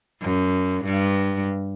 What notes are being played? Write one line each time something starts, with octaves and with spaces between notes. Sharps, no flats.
F#2
G2